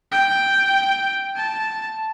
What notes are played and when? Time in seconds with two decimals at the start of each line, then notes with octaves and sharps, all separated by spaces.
0.12 G5
1.36 A5